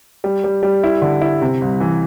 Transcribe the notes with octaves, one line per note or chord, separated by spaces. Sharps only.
G3
G3
G3
E4
D3
E4
C3
C2
E3